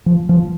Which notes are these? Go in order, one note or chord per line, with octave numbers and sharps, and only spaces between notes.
F3
F3